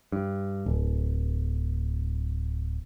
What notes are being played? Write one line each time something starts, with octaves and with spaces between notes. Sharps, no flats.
G2
D1